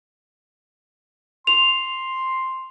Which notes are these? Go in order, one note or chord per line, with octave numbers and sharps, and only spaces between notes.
C6 F7